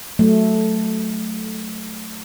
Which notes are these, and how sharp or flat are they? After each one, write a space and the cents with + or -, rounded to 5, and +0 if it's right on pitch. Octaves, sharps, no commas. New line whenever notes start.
F#3 +0 A3 -5